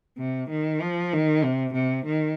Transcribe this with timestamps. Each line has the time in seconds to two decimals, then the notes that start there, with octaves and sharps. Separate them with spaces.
0.18 C3
0.50 D#3
0.81 F3
1.13 D#3
1.44 C3
1.74 C3
2.06 D#3